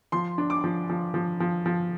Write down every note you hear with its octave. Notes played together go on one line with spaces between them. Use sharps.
F3 C6
D4
D6
F3
F3
F3
F3
F3